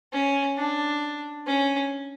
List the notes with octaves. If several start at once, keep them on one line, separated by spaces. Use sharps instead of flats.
C#4
D4
C#4